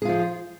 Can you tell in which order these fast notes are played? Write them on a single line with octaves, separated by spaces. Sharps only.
G#4 F4 F3